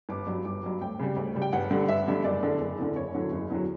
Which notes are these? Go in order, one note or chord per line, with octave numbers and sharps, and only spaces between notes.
G1 D6
G2 F#3
G1 D6
G2 F#3
D2 G5
C#3 G3
D2
C#3 G3
G5
G1 F#5
G2 D3 G3
G1 E5
G2 D3 G3
F#1 D5
E2 D3
F#1
E2 D3
F#1 C#5
E2 D3 F#3
F#1
E2 D3 F#3